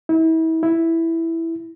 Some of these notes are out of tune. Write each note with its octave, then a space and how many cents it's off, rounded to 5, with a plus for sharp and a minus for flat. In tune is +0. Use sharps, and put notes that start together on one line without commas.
E4 -35
E4 +0